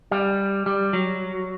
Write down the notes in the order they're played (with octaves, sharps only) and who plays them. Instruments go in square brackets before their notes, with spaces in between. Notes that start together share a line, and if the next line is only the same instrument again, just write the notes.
[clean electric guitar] G3
G3
F#3